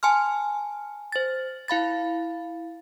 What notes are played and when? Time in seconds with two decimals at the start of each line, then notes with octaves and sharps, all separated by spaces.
0.03 G#5 A5 C6 F6
1.12 C5 A6
1.68 E4 F5 B5 A6